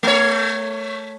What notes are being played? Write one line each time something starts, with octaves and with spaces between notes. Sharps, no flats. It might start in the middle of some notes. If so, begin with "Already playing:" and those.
A3 C#5